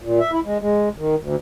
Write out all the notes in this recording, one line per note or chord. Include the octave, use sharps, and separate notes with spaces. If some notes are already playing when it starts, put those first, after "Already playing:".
A#2
E5
E4
G#3
G#3
D#3
D2